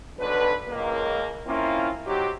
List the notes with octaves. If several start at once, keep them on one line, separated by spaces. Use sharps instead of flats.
B1 D3 D4 B4
C#2 A#3
A#3 C4 C#4 E4 F4
F#3 C4 D#4 G4